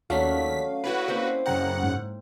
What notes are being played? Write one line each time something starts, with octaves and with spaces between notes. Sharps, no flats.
D#2 F#3 A3 C#4 D4 F5 B6
E4 F#4 B4 C#5 D5
A#3 C4 C5
F#2 C#3 F#5 G5 A#5
G#2